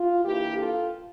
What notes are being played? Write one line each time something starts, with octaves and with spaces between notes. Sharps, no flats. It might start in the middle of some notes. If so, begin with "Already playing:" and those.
Already playing: F4
E3 A#3 D4 E4 G4
F4 A4